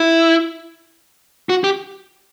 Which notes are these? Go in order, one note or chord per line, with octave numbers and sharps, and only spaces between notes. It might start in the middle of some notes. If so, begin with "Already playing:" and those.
Already playing: E4
F#4
G4